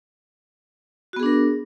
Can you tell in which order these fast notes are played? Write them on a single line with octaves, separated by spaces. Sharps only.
F#4 B3 G#4 D4 A#4